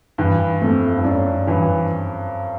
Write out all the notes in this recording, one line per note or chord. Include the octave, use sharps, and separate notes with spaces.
G2 E3
F2 A3
G2
F#2 D4
G2 E3